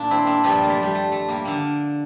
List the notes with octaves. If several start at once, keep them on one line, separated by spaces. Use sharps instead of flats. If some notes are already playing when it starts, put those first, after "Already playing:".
Already playing: A#2 A#3 D4
C4 E4
A#3 D4
G2 F3 G3 A#3
A#3
A3
G3
A3
A3
G3 A#3
D3 A#3 D4